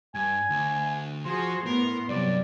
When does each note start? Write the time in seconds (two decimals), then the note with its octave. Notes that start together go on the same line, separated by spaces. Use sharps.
0.15 G2 G#5
0.50 D2
1.25 F3 F#4 G#4 C5 C6
1.66 A2 B3 A#4
2.09 G2 C3 F#3 D5